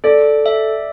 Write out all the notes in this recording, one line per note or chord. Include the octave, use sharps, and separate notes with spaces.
A4 D5
E5